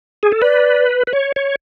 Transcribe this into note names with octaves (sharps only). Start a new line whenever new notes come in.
G#4
A4
B4 D5
B4
C#5
C#5